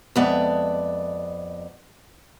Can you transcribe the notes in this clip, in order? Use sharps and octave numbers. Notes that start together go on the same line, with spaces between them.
F2 G#3 B3 D5 E5